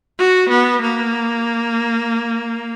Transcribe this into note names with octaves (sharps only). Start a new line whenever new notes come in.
F#4
B3
A#3